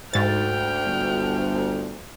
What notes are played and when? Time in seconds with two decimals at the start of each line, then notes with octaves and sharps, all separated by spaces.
0.14 D2 G#2 G5 F6 A6
0.86 G1